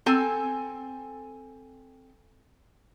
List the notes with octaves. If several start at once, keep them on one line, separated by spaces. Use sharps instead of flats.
C4 A4 G#5